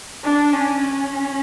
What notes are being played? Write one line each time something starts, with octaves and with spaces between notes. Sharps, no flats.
D4
C#4
C#4